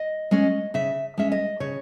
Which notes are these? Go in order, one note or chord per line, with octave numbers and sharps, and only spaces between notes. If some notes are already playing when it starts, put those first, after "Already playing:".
Already playing: D#5
G#3 C#4 D#5
C#3 E5
G#3 C#4 E5
D#5
C#3 C#5